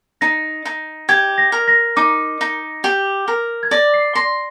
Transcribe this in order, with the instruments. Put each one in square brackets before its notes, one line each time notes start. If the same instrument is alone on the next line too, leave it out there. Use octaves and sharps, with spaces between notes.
[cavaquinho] D#4 [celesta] A#6
[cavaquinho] D#4
[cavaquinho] G4 [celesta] G#6
[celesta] A#6
[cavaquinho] A#4
[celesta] A#6
[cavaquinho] D#4 [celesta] D6
[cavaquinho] D#4
G4
A#4
[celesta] G#6
[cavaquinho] D5 [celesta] A#6
[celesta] C7
[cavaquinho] C6 [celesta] A#6